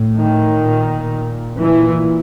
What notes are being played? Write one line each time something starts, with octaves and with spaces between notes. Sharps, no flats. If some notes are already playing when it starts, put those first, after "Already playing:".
Already playing: A2
D#3
A#2
A#2 E3